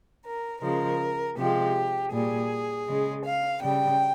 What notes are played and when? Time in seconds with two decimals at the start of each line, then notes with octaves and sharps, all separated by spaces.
0.24 A#4
0.62 C#3 F3 G#3 A#4
1.37 C3 F3 G#3 G4
2.12 A#2 G3 G#4
2.87 C#3 G#3
3.24 F5
3.62 C#3 G3 G5